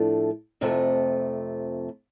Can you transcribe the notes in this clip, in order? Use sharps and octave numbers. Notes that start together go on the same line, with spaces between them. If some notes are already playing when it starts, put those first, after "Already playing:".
Already playing: A2 F3 A3 D4
F2 C3 F3 A3